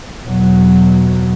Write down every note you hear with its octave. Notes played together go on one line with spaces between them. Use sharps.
E2 B2 F#3